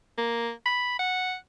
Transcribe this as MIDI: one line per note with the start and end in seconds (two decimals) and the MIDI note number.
0.18 0.50 58
0.66 0.97 83
0.99 1.35 78